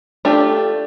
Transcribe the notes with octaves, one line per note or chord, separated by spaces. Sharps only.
A3 D4 F4 G4